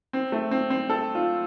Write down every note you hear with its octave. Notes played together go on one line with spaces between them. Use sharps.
C4
A3
C4
C4
A4
F4